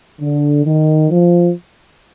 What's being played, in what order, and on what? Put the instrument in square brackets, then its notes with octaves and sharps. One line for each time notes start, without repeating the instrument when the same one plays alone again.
[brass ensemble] D3
D#3
F3